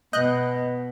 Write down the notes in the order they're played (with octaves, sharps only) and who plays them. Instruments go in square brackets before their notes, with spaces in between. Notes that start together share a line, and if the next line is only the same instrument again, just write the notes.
[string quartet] B2 [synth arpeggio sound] D#5 F#6 G6